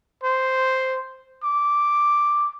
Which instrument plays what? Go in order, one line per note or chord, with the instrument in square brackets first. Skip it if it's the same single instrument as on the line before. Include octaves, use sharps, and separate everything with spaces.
[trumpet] C5
D6